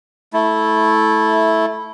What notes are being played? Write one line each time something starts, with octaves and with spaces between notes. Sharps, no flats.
A3 E4